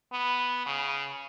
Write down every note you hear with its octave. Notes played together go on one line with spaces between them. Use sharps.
B3
C#3